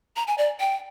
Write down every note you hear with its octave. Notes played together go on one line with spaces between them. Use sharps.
A#5
G#5
D5
G5